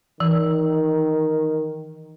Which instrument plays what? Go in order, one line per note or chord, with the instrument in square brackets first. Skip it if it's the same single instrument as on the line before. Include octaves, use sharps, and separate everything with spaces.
[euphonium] D#3 [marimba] E3